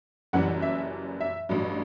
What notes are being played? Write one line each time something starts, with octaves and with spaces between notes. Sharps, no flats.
F#1 F#2 E3 G3 F#5
E5
E5
A1 G2 F#3